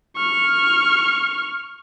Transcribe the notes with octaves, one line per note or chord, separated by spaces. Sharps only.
C#6 F6